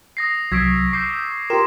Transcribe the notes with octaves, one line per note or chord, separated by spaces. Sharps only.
D#6 A#6 C7
C2 F#3 C#6 E6 G#6 B6 D7
D6 E6 G6 B6 C7
F4 G4 A#4 G5 C6 E7